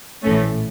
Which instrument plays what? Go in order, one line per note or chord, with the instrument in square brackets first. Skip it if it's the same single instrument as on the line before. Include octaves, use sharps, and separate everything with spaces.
[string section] A#1 A2 E3 A3 C#4